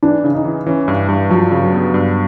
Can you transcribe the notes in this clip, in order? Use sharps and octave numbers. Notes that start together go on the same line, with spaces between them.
E3 D4
C#3
D#4
E3
E3 C#4
G2
G2
F3 F#3
C#3
F#3
B3
G2